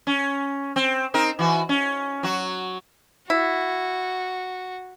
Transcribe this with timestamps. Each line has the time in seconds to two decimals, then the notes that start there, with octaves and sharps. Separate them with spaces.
0.07 C#4
0.76 C4
1.14 C4 D#4 A#4
1.39 E3 F#4
1.69 C#4
2.23 F#3 F#4
3.30 E4 F#4